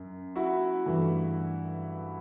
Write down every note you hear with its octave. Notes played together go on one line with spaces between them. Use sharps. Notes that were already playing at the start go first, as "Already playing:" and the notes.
Already playing: F#2
E4 F#4
G2 E3 A3